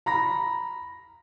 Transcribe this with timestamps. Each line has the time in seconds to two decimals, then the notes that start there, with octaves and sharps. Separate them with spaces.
0.06 A#5 B5 A#6